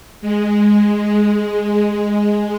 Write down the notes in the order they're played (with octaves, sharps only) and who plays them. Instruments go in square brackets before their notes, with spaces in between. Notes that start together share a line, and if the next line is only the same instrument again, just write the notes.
[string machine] G#3